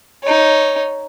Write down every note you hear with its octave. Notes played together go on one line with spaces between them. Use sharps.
D#4 C#5